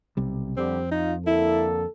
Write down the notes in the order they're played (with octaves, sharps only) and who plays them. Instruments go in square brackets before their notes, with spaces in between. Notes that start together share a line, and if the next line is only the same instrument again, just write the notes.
[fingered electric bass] B1 C3 G3
[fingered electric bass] F2 [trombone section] D3 G3 G4 [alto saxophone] C4
[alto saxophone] D#4 [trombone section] F4
[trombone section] D3 A#3 A4 [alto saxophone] E4